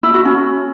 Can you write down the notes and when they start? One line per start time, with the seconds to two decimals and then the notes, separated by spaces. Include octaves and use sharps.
0.03 E4
0.14 F#4
0.25 C#4